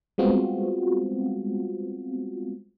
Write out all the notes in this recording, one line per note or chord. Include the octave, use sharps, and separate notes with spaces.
G3 G#3 B3 C4 F4 F#4